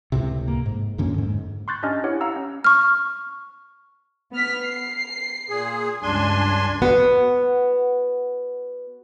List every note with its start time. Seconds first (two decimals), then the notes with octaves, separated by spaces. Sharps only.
0.12 C#2 A2 C3
0.48 A#3
0.66 G#2
0.98 F2 D3 A#3 C#4
1.18 G#2
1.68 C6 C#6 F#6 G6 A6
1.83 C#4 D4 G4 D#5 G#5 F6
2.04 E4 G4 C#5 F#5
2.21 F5 F#5 A#5 E6
2.36 C#4
2.64 C#6 F6
4.32 B3 F6 B6
4.63 C7
5.49 A#2 G#4
6.03 C#2 G2 D4 G#5 C6
6.82 B3 F#4